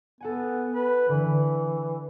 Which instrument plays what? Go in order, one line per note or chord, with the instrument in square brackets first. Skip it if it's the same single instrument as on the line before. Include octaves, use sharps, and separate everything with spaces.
[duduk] B3 [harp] A4 F#5 G#5
[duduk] B4
[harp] D3 [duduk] E3